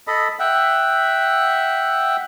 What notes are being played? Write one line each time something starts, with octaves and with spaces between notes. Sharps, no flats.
A4 D#5 B5
E5 F#5 G5